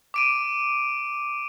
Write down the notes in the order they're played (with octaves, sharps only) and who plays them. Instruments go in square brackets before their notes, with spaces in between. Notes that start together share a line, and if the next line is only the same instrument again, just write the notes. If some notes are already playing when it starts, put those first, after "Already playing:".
[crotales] D6 D7 D#7